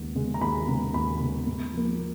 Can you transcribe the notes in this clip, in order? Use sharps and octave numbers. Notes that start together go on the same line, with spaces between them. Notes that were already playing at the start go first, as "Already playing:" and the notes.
Already playing: D#2 C#3 G#3 B3
C#3 G#3 B3
A#5
D#2 B5
C#3 G#3 B3
D#2 B5
C#3 G#3 B3
G#2
F3 A#3